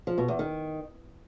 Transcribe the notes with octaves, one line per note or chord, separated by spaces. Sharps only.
F3
B2
E2
D#3